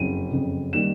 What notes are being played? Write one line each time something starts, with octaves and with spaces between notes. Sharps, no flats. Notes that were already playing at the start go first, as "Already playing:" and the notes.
Already playing: F#1 F2 C#3 D#7
F#1 F2 C#3
D#3 G3 A#3 E7